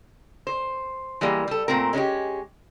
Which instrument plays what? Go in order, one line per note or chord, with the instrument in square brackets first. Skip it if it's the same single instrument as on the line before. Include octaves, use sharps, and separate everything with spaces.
[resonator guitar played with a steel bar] C5
E3 G3 G#3 A#3
G3 A4
A#2 A3 C4 A#4
G#3 C#4 D#4 G4